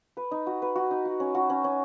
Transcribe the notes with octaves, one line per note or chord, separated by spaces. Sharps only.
B4
D#4
F#4
B4
F#4
D#4
F#4
C#4
F#4
C#4
C#4